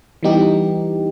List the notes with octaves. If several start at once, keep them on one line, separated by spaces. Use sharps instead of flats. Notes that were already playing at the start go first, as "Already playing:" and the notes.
E3 G3 B3 D#4 G4